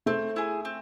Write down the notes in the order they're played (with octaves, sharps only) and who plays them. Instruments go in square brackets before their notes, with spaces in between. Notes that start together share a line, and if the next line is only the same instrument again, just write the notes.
[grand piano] A3 [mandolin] C4
[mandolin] E4 G#4
C4